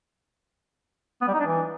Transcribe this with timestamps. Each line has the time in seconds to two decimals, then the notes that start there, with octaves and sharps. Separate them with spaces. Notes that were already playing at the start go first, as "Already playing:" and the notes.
1.22 B3
1.28 G3
1.34 D#4
1.40 D4
1.46 E3